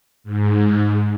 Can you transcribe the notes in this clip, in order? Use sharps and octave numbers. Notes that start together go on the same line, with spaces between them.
G#2